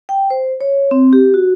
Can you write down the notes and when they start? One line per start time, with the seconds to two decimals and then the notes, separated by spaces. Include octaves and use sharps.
0.09 G5
0.30 C5
0.61 C#5
0.91 C4
1.13 G4
1.34 F#4